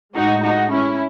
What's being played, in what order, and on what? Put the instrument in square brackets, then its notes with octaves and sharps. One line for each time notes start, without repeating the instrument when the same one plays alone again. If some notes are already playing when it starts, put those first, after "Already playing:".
[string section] A2 G#3 D#4 F#4
D#4 F#4
C#4 E4